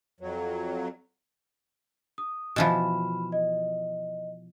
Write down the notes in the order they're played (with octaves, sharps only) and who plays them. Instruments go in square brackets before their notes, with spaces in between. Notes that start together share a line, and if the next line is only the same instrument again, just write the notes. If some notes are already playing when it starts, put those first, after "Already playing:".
[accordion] F2 F#3
[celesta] D#6
[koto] B2 E3 F3 [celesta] B5 F6 E7
[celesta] D#5